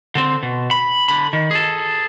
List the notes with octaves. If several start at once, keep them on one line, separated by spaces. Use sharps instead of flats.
D3 C4
B2
B5
D3 B5
D#3
G#4 A4